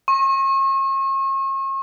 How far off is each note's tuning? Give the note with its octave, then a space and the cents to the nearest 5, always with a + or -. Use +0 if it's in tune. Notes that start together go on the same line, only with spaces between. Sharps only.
C#6 -40